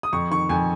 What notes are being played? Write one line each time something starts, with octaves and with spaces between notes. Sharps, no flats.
D#6
F2 C#6
D#3 C#6
F2 G#5